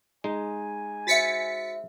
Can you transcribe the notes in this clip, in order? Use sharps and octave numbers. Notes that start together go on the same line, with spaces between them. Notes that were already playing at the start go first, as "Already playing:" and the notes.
G#3 D#4 G#5
F#4 C5 E5 A6 B6 C#7